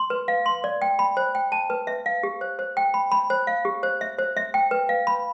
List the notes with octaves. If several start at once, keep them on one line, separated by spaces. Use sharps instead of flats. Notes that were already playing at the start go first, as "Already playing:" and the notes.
Already playing: C6
B4
F5
C6
D5
G5
B5
C5
G5
A5
B4
E5
F5
G4
C5
C5
G5
B5
B5
C5
F5
G4
C5
E5
C5
E5
G5
B4
F5
B5